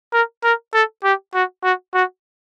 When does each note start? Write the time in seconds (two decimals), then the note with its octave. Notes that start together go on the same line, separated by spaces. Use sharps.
0.13 A#4
0.44 A#4
0.74 A4
1.04 G4
1.34 F#4
1.64 F#4
1.94 F#4